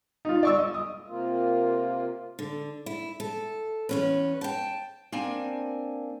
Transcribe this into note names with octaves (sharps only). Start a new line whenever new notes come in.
D#4 F4
D5 C#6 E6
D#5
D#6
C3 A#3 F4
D3
E4
A4
E2 C#4 B4
G5 A5
A#3 C4 D4 G#5